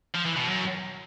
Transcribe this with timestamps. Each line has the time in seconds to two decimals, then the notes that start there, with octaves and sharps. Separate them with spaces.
0.15 F3
0.26 E3
0.37 B2
0.48 F#2